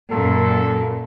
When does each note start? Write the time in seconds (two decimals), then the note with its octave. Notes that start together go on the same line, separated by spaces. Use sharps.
0.11 F#2 A#2 A4